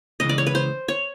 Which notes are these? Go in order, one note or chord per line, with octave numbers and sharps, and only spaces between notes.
C#2 C#3 E3 D#5
D5
C#5
B4
C5
C#5